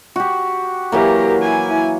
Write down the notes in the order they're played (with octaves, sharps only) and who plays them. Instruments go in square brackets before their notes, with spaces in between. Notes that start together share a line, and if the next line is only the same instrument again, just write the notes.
[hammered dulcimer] F#4 G4
[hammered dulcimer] E3 F#3 A#3 [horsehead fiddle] G4 A#4
[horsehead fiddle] E4 G#5